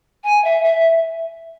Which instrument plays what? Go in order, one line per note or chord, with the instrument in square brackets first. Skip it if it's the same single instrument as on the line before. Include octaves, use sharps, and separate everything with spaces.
[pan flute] G#5
E5
E5